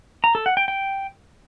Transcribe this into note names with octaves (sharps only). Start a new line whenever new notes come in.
A#5
A4
F#5
G5
G5